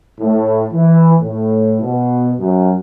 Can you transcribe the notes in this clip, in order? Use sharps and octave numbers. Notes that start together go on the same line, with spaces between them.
A2
E3
A2
B2
F#2